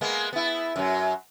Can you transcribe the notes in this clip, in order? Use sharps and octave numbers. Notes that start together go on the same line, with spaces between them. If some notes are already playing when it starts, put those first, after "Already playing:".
G#3 A#3 B3
B3 E4
F#2 F#3